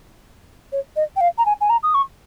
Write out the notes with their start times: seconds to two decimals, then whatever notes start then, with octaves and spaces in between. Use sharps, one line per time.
0.72 C#5
0.96 D#5
1.16 G5
1.21 F5
1.38 A#5
1.46 G#5
1.61 G#5
1.70 A#5
1.83 D#6
1.94 C#6